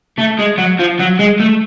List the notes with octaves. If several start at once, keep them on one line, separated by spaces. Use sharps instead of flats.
A3
G#3
F#3
F3
F#3
G#3
A3